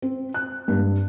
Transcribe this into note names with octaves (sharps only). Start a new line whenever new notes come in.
C4
F#6
G2